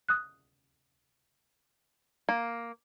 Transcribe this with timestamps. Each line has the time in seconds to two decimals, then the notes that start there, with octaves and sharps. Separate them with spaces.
0.09 D#6 F#6
2.29 A#3